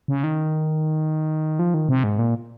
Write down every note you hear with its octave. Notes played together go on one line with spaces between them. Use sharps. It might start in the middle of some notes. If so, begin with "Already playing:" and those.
C#3
D#3
F3
D#3
C3
G#2
A#2